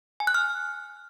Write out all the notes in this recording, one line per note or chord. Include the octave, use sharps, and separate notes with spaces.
G#5
F#6
F6